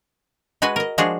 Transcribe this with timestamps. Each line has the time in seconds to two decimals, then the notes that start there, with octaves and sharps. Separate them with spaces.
0.62 G#3 F#4 B4 G#5
0.76 A#4 D#5
0.98 F3 G#3 D4 F#4 G#4